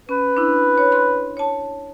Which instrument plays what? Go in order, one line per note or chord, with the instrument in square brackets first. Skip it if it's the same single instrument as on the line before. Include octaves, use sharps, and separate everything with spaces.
[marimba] C#4 [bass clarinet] B4
[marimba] D4 E4
C#5
B5 C6 F#6
C#5 A5